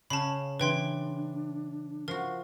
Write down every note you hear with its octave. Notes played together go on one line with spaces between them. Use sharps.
C#3 C#4 F5 A5 B5
C#3 E3 D4 B4 G5 C6
F3 F#4 A#4